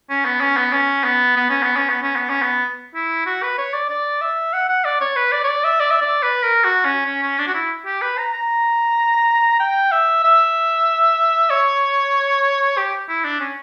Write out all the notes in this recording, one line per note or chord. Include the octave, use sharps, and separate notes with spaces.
C#4
B3
C#4
B3
C#4
B3
B3
C#4
B3
C#4
B3
C#4
B3
C#4
B3
E4
F#4
B4
C#5
D5
D5
E5
F#5
F#5
D5
C#5
B4
D5
C#5
D5
E5
D5
E5
D5
B4
A#4
F#4
C#4
C#4
C#4
D4
F#4
E4
G4
B4
A#5
A#5
G5
E5
E5
C#5
G4
E4
D4
C#4